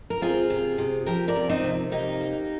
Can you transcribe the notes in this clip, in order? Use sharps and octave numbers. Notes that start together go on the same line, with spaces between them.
A#4
C4 F4 G#4
C3
C3
F3 G4 A#4
A#4 D5
C3
C4 D#4
C3
A#3 D#4 G4
A#3